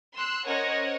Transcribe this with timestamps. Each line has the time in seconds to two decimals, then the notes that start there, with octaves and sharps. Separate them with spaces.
0.16 C6 E6 F#6
0.47 C#4 A#4 C5 C#5 D#5 F#5